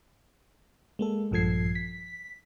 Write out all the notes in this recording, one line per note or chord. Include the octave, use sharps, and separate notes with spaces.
G#3 A#3 A4
A#1 G2 F3 A4 G#6 C7
B6